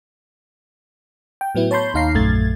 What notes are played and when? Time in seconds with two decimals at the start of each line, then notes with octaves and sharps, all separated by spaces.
1.41 G5
1.55 A2 F#3 B3 E4
1.71 C#5 A5 B5 C6 G6
1.94 D#2 D#4 F5 A#5 C7
2.14 A#1 F#2 A3 G#6 A6